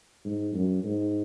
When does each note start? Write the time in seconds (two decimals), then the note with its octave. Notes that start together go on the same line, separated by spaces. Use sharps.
0.25 G#2
0.54 F#2
0.84 G#2